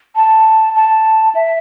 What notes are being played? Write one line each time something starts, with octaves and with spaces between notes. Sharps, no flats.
A5
A5
E5